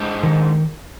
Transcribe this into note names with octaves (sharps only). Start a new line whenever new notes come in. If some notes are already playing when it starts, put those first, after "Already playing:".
Already playing: G#3 D4 G#4 C5
D#3